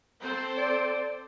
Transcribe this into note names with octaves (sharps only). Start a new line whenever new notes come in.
C4 A4 C5
D5